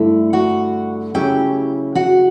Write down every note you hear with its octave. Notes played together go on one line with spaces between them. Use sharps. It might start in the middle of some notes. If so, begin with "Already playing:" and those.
Already playing: G2 D3 A3 E4
F#4 F#5
C#3 F#3 C#4 E4 G4 G5
F#4 F#5